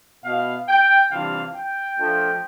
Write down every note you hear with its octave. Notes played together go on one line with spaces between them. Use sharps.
B2 B3 E4 F5
G5
C3 E3 G3 D4 F4 F5
G5
F3 A3 D4 F4